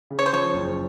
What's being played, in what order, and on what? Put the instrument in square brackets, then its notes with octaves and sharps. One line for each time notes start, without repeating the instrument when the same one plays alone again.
[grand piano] C#3
[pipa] C#5
C5
[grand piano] F3 [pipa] C#5
[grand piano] F#1